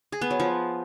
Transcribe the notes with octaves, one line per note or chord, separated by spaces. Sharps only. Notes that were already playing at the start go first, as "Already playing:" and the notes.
G#4
B3
F#3
F3